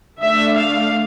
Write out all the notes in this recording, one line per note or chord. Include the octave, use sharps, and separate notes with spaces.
D3 A3 D4 E5
F5